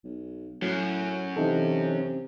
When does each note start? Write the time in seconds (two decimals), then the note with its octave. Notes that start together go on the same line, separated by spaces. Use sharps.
0.04 B1
0.62 F#2 A2 F#3
1.37 C3 E3 D#4 A4